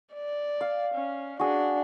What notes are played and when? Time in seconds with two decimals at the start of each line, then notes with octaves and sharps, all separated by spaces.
0.14 D5
0.61 F5
0.94 C#4
1.39 D4 F#4 G#4